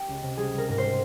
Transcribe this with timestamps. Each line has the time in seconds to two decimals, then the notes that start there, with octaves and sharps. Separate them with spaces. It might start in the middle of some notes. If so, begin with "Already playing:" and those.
Already playing: G4
0.08 C#2
0.23 C3
0.37 G3 G#4
0.54 G3 A#4
0.69 G#2 A#4
0.78 C5
0.84 G3